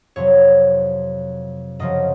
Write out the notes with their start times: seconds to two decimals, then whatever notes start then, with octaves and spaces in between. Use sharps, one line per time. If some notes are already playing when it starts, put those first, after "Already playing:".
0.16 F2 C3 F#3 C#5
1.79 F#2 C#3 F3 D#5